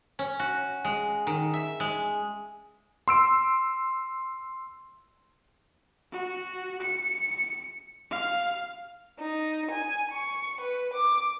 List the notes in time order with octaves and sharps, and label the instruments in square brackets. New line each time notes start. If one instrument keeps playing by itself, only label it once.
[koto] C#4
F#4
G#3
D#3
E5
G#3
[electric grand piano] C6 E6 D7
[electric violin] F#4
C#7
F5
[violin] D#4
G#5
C#6
B4
D6